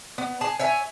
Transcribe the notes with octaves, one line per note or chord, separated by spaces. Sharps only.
B3
G#4 A5
C#5 E5 G#5